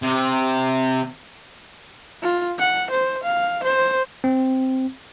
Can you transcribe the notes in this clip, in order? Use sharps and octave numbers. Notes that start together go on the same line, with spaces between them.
C3
F4
F#5
C5
F5
C5
C4